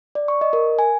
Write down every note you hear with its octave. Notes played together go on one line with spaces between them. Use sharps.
D5
C#6
D#5
A#4
G#5